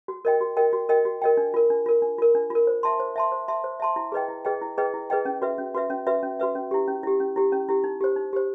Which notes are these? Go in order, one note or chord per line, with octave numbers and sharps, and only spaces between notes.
F#4
A#4 D#5 G5
F#4
A#4 D#5 G5
F#4
A#4 D#5 G5
F#4
A#4 D#5 G5
D4
F4 A#4
D4
F4 A#4
D4
F4 A#4
D4
F4 A#4
C5
E5 A5 C6
C5
E5 A5 C6
C5
E5 A5 C6
C5
E5 A5 C6
E4
G#4 B4 D#5 G5
E4
G#4 B4 D#5 G5
E4
G#4 B4 D#5 G5
E4
G#4 B4 D#5 G5
C#4
F#4 B4 E5
C#4
F#4 B4 E5
C#4
F#4 B4 E5
C#4
F#4 B4 E5
C#4
E4 G4
C#4
E4 G4
C#4
E4 G4
C#4
E4 G4
D#4
G4 C5
D#4
G4 C5